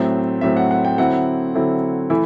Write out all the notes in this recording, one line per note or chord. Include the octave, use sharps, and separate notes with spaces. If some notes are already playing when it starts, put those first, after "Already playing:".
Already playing: A2 F#3 C4 E5
A2 F#3 C4 E5
F#5
F#5
G5
D3 F#3 C4 E4 F#5
D3 F#3 C4 E4
E3 A3 E4